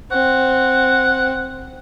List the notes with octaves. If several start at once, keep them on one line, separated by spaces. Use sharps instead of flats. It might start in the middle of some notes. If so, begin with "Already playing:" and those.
C4 F#5